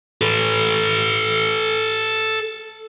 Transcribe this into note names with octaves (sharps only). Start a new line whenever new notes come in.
A4 B4